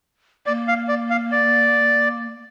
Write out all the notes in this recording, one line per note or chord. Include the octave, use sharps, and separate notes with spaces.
A#3 D5
F5
D5
F5
D5